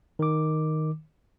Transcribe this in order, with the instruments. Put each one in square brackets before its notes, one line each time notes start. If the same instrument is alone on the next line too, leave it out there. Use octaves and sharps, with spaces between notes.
[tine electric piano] D#3 D6